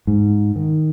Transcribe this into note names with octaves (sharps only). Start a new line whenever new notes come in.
G#2
D#3